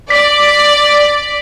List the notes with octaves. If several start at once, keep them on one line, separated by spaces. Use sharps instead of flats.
D5 B6